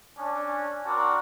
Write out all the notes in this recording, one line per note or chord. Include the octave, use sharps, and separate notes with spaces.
C#4 D4
C4 D4 F#4 A#4 D5